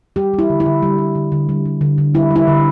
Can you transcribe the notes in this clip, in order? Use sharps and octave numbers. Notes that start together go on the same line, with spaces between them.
G3 G4
G3
E4
D3
E4
D3
G3
G3
D3
D3
G3
G3
D3
D3
G3 E4
G3
E4
D3